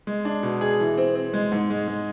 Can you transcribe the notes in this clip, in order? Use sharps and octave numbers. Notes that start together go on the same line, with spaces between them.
G#3
D4
B2
G#4
E3
C4
C4
G#3
G#2
G#3
G#3